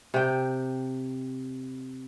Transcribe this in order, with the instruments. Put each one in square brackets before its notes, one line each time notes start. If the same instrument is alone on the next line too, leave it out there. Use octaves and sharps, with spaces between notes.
[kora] C3 G5